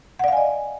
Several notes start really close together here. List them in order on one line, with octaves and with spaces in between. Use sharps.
F#5 D5 F5 G#5 D#5